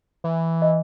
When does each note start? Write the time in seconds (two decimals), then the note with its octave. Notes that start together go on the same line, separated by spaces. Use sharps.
0.24 E3
0.62 D#5